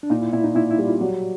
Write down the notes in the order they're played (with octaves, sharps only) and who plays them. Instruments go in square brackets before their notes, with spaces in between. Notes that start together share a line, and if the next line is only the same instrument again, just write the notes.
[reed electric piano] D4
[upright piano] A#2 [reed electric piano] D#4
[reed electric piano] E4
[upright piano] A#2 [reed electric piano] E4
[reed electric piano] D#4
[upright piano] A#2 [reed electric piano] E4
[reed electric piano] E4
[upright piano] G3
[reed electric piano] F4
[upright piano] F#3 [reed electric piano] F#4